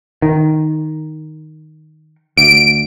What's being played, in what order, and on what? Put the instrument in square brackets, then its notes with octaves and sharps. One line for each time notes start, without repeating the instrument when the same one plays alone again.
[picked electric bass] D#3
[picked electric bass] D2 [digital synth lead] D7